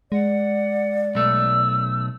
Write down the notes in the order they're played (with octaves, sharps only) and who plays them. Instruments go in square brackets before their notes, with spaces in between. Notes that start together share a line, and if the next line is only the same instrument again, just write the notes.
[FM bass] G#3 [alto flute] D5 [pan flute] F#5
[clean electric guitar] B1 A3 [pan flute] E6